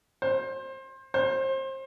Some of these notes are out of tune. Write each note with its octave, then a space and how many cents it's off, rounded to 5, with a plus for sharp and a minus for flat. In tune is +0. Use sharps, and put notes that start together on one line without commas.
C5 +25
C5 +30